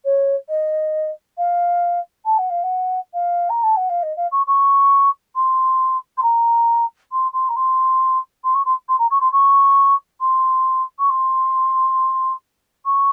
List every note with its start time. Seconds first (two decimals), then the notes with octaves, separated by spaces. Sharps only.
0.05 C#5
0.49 D#5
1.38 F5
2.25 A5
2.38 F#5
2.50 F5
2.63 F#5
3.14 F5
3.50 A#5
3.63 A5
3.77 F#5
3.90 F5
4.03 D#5
4.17 F5
4.32 C#6
4.47 C#6
5.36 C6
6.18 C6
6.23 A#5
7.12 C6
7.33 C6
7.49 A#5
7.56 C6
8.44 C6
8.54 C#6
8.66 C6
8.89 C6
8.99 A#5
9.11 C#6
9.21 C6
9.32 C#6
10.21 C6
10.99 C#6
11.09 C6
12.85 C#6